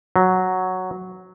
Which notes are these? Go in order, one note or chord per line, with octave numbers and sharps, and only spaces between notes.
F#3